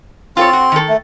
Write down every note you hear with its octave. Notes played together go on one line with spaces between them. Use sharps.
C4 F4 A4 C#5 C6
F#4
D#3 A4
A3